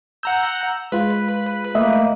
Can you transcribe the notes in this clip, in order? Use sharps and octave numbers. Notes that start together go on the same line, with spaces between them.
F#5 A#5 E6 G6
G#3 F4 B4
A3 A#3 D#5 E5